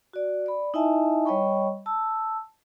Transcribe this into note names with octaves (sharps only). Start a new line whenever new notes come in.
F#4 D5
D5 B5
D#4 E4 D#5 E5 G#5 A5
G3 C#5 D#5 G5 B5 C#6
A5 E6